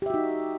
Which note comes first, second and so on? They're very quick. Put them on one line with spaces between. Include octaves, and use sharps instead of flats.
G4 E5 F#4 D#4